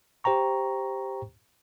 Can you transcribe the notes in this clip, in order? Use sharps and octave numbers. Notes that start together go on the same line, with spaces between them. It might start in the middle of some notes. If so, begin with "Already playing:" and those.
G4 C5 G5 A#5 C#6